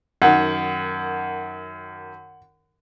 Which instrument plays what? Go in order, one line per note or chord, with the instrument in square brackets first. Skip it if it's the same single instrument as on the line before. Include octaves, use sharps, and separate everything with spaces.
[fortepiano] F#2 D#3 [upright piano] F#5